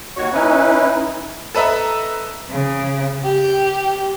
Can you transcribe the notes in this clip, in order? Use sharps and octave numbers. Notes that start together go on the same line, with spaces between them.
D#2 D#3 F#4 C#5 C#6
C#4 D#4 E4 B4
A4 B4 D#5 E5 A#5
C#3
G4